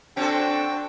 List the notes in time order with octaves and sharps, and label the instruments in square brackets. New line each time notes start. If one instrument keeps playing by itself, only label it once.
[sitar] C4 F#4 A4 [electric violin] D4 [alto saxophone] G5